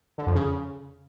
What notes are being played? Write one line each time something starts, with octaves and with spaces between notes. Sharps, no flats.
D3
F2
C#3